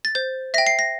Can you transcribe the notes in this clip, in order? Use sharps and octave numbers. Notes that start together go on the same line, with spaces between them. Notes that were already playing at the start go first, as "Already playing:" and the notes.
A6
C5 G6
E5 G5 A#6
C7
A#6